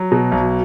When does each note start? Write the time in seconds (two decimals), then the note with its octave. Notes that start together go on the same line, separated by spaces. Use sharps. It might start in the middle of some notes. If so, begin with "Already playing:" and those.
Already playing: F#3
0.12 B2
0.32 B1